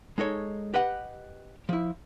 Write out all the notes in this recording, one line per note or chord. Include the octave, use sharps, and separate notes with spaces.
G#3 D#4 A4 C#5
G4 B4 D#5 F#5
F3 E4